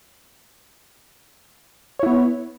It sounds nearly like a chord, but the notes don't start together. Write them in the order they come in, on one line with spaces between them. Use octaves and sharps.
C#5 E4 B3